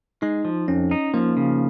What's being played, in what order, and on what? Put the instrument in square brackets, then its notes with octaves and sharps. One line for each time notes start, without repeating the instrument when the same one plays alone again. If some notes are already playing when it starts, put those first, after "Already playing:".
[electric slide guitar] G#3 [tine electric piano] D#4
[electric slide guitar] F3
[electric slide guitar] F2 [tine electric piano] C#4
[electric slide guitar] D#4
[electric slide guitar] F3 [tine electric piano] A#3
[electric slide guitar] C#3